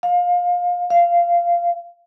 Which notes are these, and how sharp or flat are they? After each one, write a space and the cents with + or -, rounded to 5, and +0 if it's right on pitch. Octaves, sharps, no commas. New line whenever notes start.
F5 +25
F5 -15